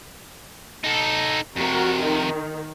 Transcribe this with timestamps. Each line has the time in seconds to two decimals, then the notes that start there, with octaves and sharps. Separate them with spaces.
0.84 D#4 A4
1.56 F2 C3 F#4 A#4
2.02 D#3